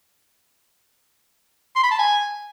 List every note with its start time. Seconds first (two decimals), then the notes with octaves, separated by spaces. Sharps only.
1.76 C6
1.84 B5
1.91 A5
1.99 G#5